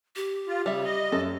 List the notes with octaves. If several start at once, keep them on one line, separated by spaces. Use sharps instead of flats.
G4
F4
C#3 G3 E5
D#5
F#2 A4